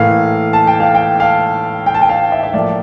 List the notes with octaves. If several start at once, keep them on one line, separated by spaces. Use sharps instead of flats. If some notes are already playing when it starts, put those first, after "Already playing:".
Already playing: A2 E3 A#3 F5
A5
G5
F5
G5
F5
G5
A5
G5
F5
E5
E5
A2 F3 A#3 D5